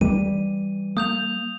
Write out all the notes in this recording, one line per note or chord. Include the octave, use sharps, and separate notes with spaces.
E3 G3 D#7
A#3 D#6 G6 F7